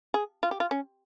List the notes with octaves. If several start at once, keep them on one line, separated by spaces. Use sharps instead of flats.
G#4
F4
G4
F4
C#4